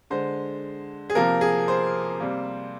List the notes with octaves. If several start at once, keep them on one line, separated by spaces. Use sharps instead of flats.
D3 G#3 C5
G#4
C3 F3 A#3 A#4
G#4
C5
C3 G3 A#3